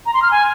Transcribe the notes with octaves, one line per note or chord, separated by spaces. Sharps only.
A#5
C6
F6
G#5